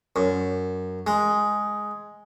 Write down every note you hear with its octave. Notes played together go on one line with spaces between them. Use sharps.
F#2
G#3